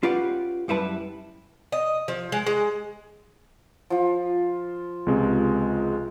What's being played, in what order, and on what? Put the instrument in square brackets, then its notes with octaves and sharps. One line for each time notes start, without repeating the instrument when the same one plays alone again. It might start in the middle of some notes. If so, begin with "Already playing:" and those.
[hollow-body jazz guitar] C#4 F4 G4 B4 D5 F#5
F#2 G3 E4 B4 A5
[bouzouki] D#5
F3
G#3
G#3
[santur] F3 F4
[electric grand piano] C#2 C3 G#3